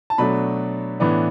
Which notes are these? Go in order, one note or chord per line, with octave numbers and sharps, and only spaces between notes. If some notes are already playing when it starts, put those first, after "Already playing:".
A5
B2 F#3 A3 D4 B5
A2 E3 B3 D4